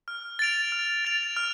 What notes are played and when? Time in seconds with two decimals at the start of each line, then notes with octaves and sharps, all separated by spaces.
0.08 F6
0.39 A6 D7 F7
0.72 F6
1.05 A6 D7 F7
1.36 F6